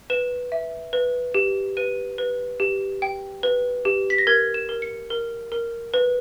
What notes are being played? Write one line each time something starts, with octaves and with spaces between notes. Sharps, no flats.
B4 E7
E5
B4
G4
B4 D#7
B4
G4
G5
B4
G4
B6
A#6
A#4 G#6
E7
A#4
C#7
A#4
A#4
B4